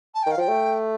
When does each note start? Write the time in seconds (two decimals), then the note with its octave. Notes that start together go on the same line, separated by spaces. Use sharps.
0.14 A5
0.23 G5
0.26 D#3
0.31 F5
0.37 F3 G5
0.48 A3